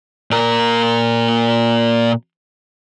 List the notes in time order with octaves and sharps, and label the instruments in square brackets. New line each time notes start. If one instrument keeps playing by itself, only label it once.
[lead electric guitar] A#2 A#4